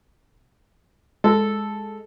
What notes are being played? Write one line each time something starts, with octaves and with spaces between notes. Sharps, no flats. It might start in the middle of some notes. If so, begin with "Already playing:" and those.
G#3 A4